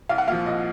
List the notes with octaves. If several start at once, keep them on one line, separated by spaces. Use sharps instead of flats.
C2 F5
F#5
A#2 F3 F5
C2 D#5